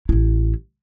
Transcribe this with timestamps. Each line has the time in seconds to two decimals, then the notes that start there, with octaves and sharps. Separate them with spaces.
0.09 A1 E4